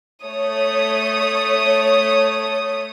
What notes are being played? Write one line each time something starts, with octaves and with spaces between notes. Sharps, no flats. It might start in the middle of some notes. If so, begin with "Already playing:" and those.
A3 C#5 D#6